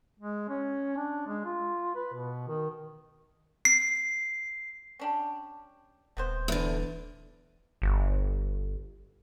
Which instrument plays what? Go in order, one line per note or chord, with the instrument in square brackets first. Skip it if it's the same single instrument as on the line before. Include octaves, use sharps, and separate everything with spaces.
[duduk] G#3
C#4
D4
G#3
F4
B4
B2
D#3
[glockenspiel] C7
[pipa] C#4 D4 G4
[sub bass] D#1 [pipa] C3 B3 C5
[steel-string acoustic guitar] E2 D3
[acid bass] G1